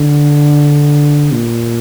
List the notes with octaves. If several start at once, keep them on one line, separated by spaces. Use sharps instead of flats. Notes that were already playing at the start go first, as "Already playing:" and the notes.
Already playing: D3
A#2